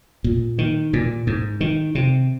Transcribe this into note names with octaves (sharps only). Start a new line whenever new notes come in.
A#2
D#3
A#2
G#2
D#3
C3